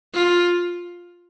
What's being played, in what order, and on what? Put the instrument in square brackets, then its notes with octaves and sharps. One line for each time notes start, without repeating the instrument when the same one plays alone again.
[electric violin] F4